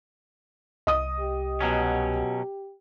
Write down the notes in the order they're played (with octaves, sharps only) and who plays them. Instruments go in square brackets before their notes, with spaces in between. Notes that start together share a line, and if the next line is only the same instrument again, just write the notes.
[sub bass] C2 [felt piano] D#5 D#6
[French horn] G4
[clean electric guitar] B2 F#3 C#4